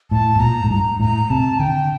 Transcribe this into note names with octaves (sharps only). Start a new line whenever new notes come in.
A2 A5
A2
A#2 A#5
A2
G2 A#5
A2 A#5
C3 A5
D3 G5